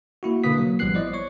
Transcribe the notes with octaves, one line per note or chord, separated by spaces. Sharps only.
A#3 E4 F#4
B2 D3 A#3 B4 D#6 B6
F#3 A#3
A1 F3 G3 B3 F#6 C7
E4 C5 D5 D#5
C#5 C#6